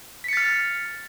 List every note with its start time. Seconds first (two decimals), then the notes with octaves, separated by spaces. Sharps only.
0.24 B6
0.28 C#7
0.33 A6
0.37 F6